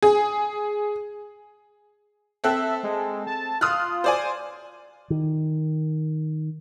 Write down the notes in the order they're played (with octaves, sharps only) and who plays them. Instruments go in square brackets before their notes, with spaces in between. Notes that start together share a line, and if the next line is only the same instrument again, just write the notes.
[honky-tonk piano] G#4
[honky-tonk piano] C4 A4 F#6 [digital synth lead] E5
[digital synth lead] G#3
A5
[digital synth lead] F4 [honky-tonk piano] D#6 F6 F#6
[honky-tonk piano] C5 D5 G#5
[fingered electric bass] D#3